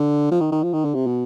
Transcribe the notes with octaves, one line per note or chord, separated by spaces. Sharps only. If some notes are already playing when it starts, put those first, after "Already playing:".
Already playing: D3
F3
D#3
D#3
F3
D#3
D3
C3
B2